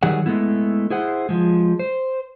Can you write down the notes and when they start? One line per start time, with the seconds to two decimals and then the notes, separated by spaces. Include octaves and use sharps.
0.03 D#3 F#3 G3 G#4 F#5
0.26 G#3 A3 B3 E4
0.90 E4 G#4 C5 F#5
1.29 F3 G#3
1.79 C5